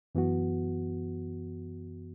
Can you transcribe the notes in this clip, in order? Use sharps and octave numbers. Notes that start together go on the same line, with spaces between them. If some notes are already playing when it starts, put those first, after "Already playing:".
F#2 E3 B3 F#4